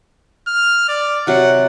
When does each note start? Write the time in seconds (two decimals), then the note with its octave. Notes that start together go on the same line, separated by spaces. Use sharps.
0.48 F6
0.88 D5
1.27 C3 F#3 F#5